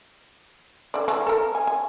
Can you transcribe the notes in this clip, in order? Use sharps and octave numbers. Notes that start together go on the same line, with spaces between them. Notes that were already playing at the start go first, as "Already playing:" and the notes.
D3 D5
E3 A3 D4
A4 A#4
G#5
G#5